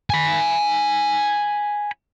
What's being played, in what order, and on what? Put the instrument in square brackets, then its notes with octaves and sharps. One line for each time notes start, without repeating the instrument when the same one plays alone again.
[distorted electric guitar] G#5 B5